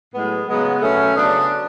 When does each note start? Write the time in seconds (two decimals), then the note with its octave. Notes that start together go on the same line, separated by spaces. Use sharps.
0.14 A2 F#3 G#3 B3
0.48 C#3 F#3 G#3 B3
0.81 B2 F#3 A3 C#4
1.15 C#3 F#3 B3 D4